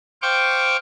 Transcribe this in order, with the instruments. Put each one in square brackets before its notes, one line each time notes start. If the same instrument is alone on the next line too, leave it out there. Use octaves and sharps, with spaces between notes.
[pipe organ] C5 F5 G5 C#6 D6